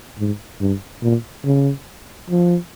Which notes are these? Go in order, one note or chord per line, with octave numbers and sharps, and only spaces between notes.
G#2
G2
A#2
C#3
F3